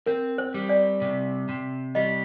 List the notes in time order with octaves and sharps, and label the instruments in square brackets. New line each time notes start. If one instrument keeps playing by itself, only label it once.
[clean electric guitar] C4 [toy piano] A#4
[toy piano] C5
[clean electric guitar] G3
[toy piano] D5
[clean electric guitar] C3
C3
[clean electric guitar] G3 [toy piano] D#5